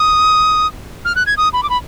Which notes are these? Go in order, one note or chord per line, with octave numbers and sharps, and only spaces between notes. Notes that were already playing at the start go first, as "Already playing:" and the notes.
Already playing: D#6
F6
F#6
G#6
D#6
B5
D6
B5